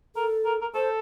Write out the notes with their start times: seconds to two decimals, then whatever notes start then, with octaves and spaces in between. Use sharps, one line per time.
0.16 A4 A#4
0.45 A#4
0.61 A#4
0.74 A4 C5